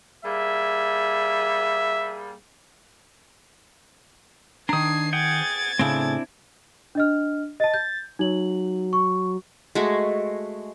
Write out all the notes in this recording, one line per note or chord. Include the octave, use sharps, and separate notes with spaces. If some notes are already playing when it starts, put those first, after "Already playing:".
G3 A#3 G#4 E5
D#3 D4 A#5 D#6 G#6 C7
G#4 F#5 G5 G#6 A6
A2 C#3 C4 D4 E4
D4 D#5 F6
D#5 A5 A6
G6
F#3 D#4 F#7
C#6
G#3 A3 F#4